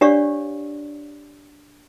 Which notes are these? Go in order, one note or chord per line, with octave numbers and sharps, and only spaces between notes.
D4 G4 C#5 D5 F5 C#6